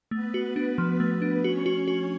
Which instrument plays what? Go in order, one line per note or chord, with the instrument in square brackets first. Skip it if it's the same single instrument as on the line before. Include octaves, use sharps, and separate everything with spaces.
[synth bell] A3 [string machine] B3 B4
[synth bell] F#4
[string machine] B3 B4
[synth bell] D4
F3
A3
D4
[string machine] C#4 C#5 [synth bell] F#4
[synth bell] F#4
F#4